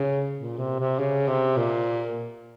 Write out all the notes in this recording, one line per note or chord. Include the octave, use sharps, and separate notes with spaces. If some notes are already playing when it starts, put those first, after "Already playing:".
Already playing: C#3
A#2
C3
C3
C#3
C3
A#2